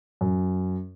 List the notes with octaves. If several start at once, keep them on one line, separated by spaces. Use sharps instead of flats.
F#2